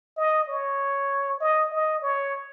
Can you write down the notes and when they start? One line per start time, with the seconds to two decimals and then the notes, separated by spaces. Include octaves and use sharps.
0.17 D#5
0.48 C#5
1.40 D#5
1.71 D#5
2.02 C#5